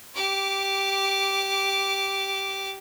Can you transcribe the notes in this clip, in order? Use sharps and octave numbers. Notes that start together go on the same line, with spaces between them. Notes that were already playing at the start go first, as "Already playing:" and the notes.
G4 D6